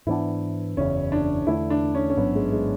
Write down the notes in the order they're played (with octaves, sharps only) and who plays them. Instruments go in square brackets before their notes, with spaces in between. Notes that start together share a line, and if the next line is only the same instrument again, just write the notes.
[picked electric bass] G#2 E3 B3 D4 [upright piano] E4
[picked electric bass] F#1 E2 C#3 [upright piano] C#4
[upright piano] D4
[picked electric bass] E2 D3 A3 [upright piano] E4
[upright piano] D4
C#4
C#4
[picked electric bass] A1 G#2 F#3 [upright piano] B3
[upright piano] G#3
G#3